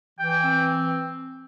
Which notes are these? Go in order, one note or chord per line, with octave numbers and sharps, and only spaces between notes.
E3 G5
C4